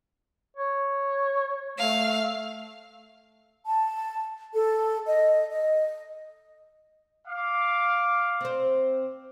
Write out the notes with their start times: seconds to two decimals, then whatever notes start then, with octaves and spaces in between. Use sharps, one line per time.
0.57 C#5
1.78 A3 F5
3.65 A5
4.53 A4
5.06 D#5
5.50 D#5
7.28 F5 D6
8.41 C4 C5